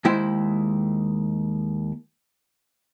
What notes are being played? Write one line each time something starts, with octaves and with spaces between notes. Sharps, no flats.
D#2 G#3 E4 C5 G5